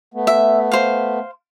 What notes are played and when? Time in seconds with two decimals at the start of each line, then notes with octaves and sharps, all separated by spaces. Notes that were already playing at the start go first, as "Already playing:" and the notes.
0.14 A3 B3
0.27 E5
0.72 C5 F5